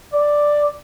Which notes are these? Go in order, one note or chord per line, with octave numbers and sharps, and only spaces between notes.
D5